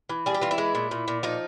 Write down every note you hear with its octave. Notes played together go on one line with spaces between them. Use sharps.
E3
G3 G#4
G4
E3 F4
E4
G#3
A#2
A#2
A#2
F3 D#4